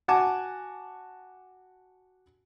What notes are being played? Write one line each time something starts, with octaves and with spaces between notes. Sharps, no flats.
F#4 F#5 G#5 A5 D6